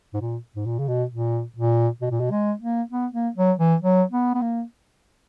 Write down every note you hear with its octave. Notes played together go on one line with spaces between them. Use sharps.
G#2
A#2
G#2
A#2
C#3
B2
A#2
A#2
B2
A#2
B2
G#3
A#3
B3
A#3
F#3
E3
F#3
B3
B3
A#3